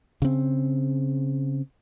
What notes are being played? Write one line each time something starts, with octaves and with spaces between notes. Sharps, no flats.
C#3 C4